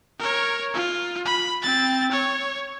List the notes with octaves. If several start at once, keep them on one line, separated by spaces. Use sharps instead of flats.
A#4 C#5
F4
B5
C4 A6
C#5